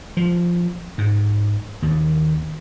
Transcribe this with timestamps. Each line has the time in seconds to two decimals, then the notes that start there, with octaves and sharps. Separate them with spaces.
0.17 F3
0.98 G#2
1.82 D#2